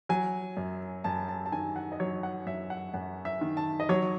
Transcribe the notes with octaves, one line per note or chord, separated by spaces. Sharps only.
F#3 G#5
F#2
F#2 A5
A5
A5
D#3 G#5
F#5
D#5
F#3 C#5
F#5
F#2 E5
F#5
F#2 F#5
E5
D#3
A5
D#5
F#3 C#5